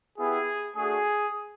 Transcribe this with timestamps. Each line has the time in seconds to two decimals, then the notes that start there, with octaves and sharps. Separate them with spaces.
0.18 B3 E4 G4 G#4
0.77 A3 D4 F#4 G#4